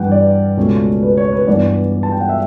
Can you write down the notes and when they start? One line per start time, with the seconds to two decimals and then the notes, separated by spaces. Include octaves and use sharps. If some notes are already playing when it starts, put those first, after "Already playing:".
Already playing: G2 E3 G3 F#5 G5
0.12 D5
0.57 C#2 B2 A3 C#4
1.03 B4
1.17 C#5
1.32 B4
1.47 G2 E3 B3 D5
2.03 A5
2.12 G5
2.21 F#5
2.29 E5